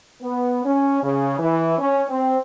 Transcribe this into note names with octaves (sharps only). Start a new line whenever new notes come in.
B3
C#4
C#3
E3
C#4
C4